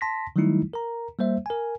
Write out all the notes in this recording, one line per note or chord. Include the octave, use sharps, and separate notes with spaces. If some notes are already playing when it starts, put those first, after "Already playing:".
A5 C6 A#6 B6
D#3 F#3 G3 A3 D#4 E4
A#4 A#5
G3 A#3 C5 E5
A#4 G#5